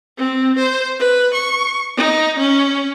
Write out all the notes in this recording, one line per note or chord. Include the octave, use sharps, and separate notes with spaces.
C4
C5
B4
C#6
D#4
C#4